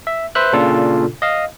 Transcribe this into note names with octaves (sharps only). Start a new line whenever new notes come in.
E5
B4 C5 E5 F#6
A#2 C#3 D4 F4 A4
D#5 F5